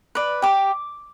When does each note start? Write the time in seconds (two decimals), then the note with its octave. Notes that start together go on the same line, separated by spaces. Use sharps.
0.15 B4 D5
0.42 G4 D6